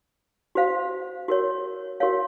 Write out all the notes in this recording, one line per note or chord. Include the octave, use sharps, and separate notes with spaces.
F#4 C5 F5
F#4 A#4 C#5
F#4 A#4 C#5 F5